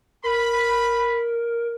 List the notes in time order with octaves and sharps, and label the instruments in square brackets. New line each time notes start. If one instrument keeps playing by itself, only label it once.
[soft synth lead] A#4 [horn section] B5